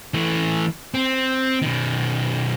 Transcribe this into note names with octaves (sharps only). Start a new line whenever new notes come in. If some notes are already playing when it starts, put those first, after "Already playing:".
E3 A3
C4
B2 D#3